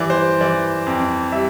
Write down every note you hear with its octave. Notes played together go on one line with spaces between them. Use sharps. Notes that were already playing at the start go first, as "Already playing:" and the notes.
Already playing: E3 G3 D5
C5
E3 D5
F2
G3 E5